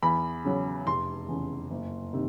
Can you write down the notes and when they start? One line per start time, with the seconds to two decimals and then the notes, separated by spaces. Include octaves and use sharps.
0.02 E2 B5
0.45 C#3 F#3
0.87 F1 C6
1.28 E2 C#3
1.71 F#1
2.13 C3 D#3